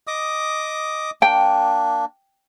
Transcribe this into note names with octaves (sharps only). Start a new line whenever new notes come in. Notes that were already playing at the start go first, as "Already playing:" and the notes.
D#5 D6 D#6
A#3 D4 G5